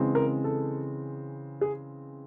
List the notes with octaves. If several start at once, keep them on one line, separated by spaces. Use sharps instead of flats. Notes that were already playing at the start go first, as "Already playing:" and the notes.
Already playing: C#3 E3 G#3 C4
A#4
A4
G#4